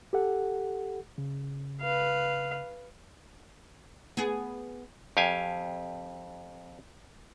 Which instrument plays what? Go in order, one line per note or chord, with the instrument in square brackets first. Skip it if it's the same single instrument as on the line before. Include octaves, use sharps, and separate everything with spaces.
[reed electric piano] G4 A4 F#5
C#3
[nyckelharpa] B4 F5
[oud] B3 G#4
[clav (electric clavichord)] F2 G4 F5 G#5